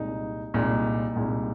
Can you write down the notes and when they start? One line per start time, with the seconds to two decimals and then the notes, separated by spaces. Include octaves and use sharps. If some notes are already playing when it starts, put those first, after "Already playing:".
Already playing: C2 A#2 G#3 D#4
0.54 C2 A#2 G#3 D#4
1.15 C2 A#2 G#3 D#4